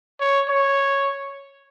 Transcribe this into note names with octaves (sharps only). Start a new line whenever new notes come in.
C#5
C#5